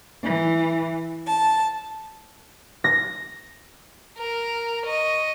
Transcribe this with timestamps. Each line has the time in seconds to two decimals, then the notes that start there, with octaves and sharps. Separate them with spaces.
0.23 E3
1.26 A5
2.84 A#6
4.17 A#4
4.85 D#5 C#6